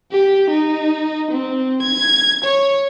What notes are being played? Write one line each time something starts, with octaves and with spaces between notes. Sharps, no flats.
G4
D#4
C4
G#6
C#5